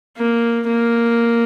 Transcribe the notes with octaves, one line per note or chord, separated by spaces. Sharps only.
A#3
A#3